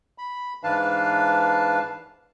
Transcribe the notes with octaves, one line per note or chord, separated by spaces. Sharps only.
B5
G#2 E3 D4 B4 F5 A5